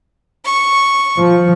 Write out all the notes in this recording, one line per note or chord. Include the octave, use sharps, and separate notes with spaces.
C#6
F3